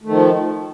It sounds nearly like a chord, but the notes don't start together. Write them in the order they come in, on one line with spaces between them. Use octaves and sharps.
A3 D#3 F3